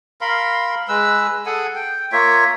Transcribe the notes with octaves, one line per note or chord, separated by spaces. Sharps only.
A#4 F5 B5 C6
G#3 B4 E6
G#4 A4 F#5 G#5
G5
A#3 F4 C#5 E5